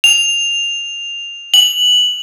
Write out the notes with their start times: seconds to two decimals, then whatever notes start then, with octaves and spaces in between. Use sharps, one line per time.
0.04 F7
1.54 F#7